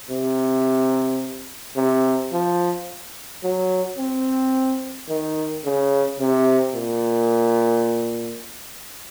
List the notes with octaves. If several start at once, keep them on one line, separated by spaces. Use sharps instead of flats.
C3
C3
F3
F#3
C4
D#3
C#3
C3
A#2